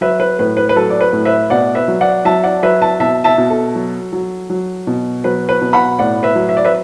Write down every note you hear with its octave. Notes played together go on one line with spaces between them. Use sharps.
F#3 B4 E5
B4
A2 B4
B4
B4
F#3 A4
D5
B4
A2
B4 E5
B2 D5 F#5
B4 E5
F#3
D5 F#5
F#3 E5 A5
D5 F#5
F#3 B4 E5
E5 A5
B2 E5 A5
E5 A5
B2
A4
F#3
F#3
F#3
B2
F#3 B4
B4
B2
F#5 B5
A2 D5 F#5
B4 E5
F#3
E5
D5
B4 E5